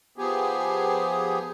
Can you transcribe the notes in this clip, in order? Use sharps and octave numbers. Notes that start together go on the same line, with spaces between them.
F3 B3 G4 G#4